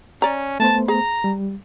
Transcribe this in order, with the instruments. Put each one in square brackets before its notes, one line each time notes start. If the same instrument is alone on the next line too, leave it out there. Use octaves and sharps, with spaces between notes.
[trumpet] C#4 [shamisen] D5 A#5
[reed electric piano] A3 B3 C5 [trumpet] A5
[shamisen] G#4 [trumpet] A#5
[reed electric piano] G3